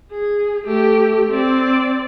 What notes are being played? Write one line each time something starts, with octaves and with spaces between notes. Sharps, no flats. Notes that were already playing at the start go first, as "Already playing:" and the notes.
G#4
A3 G4
C4 D5